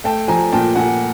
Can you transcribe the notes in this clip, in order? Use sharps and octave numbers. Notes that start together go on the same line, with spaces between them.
A3 G5 A5
F3 G#5 A#5
A#2 G5 A5
A#2 F#5 G#5